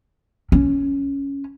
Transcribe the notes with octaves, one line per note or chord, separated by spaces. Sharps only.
C#4